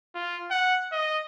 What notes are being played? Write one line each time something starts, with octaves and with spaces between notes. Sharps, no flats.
F4
F#5
D#5